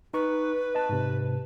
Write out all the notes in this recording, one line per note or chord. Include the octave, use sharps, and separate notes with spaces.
D#4 B4 C#6
D#5 A5
G#2 C3